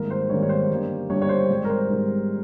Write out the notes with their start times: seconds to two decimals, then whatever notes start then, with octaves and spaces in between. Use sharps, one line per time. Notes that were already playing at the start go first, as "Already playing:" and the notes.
Already playing: G#1 G#2 D#3 G3 A#3 A#4
0.10 C5
0.29 G#1 G#2 D#3 G3 A#3 C#5
0.43 C#5
0.49 C5
0.70 G1 G2 G3 A#3
1.09 G1 G2 G3 A#3 C#5
1.22 C#5
1.29 C5
1.49 G#1 G#2 G3
1.65 A#4
1.70 C5
1.89 G#1 G#2 G3